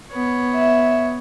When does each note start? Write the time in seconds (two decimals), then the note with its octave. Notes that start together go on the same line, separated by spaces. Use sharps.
0.12 B3 C#5
0.55 E5